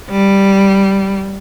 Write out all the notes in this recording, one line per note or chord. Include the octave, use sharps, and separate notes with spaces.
G3